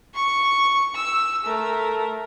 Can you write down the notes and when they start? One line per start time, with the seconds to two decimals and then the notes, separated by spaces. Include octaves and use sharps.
0.15 C#6
0.95 E6
1.45 A3 A#4